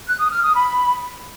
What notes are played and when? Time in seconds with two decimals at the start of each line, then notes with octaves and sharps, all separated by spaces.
0.07 F#6
0.19 D#6
0.31 F6
0.43 D#6
0.55 B5